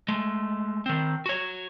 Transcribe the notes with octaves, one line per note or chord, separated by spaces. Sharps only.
G#3 A3
D#3 C4
F#4 C#5